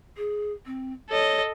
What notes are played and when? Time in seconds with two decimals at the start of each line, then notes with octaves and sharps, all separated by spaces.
0.17 G#4
0.66 C4
1.10 A4 C#5 D#5